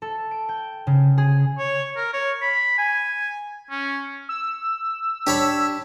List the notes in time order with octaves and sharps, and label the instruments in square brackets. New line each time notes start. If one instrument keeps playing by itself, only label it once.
[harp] A4
D7
G5
C#3
G#4
[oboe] C#5
A#4
C#5
B5
G#5
C#4
[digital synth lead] E6
[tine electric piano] D4 [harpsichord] G4 C#5 B5